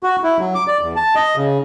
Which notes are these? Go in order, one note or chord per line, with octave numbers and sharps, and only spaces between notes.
F#4
E4
F#3
D6
D5
E2
A5
D#5
C#3